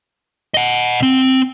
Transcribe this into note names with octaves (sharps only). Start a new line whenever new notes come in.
D#5 F#5
C4